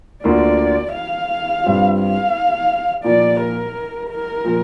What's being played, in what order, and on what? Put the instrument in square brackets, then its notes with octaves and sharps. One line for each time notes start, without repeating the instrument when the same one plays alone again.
[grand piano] D2 D3 A#3 F4 [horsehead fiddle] D5
[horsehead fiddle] F5
[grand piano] G2 G3 C4 F4
[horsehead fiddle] F5
[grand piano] A#2 F3 A#3 [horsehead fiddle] D5
[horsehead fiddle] A#4
A#4
[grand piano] A#2 F3